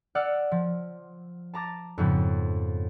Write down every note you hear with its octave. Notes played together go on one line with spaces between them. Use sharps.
D5 F#5 E6 F6
F3
A5 A#5 D6 A6
F2 G#2 C#3 F3 B3